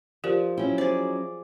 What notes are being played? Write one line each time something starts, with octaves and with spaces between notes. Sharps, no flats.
F3 G4 A#4 D5
F#3 C#4 E4 G5
G#4 C5 D5